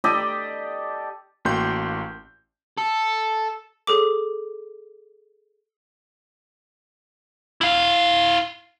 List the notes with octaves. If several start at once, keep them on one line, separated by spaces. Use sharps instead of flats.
G4 A4 D5 D#5
A1 A#3 F#4 G5 C6 G6
A4
G#4 A4 D6
E4 F5